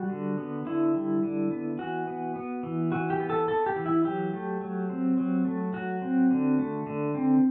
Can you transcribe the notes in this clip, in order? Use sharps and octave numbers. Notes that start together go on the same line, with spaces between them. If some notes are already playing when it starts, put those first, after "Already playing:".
Already playing: G3 F#4
D3
B3
D3 E4
G3
D3
B3
E3 F#4
B3
B3
E3
E3 F#4
G4
B3
A4
B3 A4
G4
E3
E4
F#3 G4
A3
F#3
C4
F#3
A3
F#3 F#4
C4
D3
A3
D3
C4